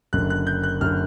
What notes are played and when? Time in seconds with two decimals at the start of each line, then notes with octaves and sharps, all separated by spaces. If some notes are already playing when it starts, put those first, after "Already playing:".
0.13 F#1 F#2 D3 F#6
0.30 F#6
0.47 G6
0.63 F#6
0.81 F#1 F#2 D3 F6